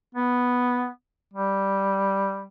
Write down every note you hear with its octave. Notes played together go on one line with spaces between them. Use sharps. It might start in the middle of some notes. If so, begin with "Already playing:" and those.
B3
G3